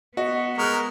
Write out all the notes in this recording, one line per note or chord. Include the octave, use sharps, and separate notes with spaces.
B3 F#4 D#5
G#3 A#4 C#6 F#6